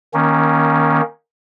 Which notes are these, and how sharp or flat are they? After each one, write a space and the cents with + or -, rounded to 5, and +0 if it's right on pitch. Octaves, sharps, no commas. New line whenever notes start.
D#3 +0 A#3 +20 C#4 +0